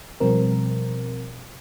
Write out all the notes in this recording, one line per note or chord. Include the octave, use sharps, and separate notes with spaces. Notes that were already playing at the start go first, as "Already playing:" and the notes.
B2 F3 G3 C4 A#4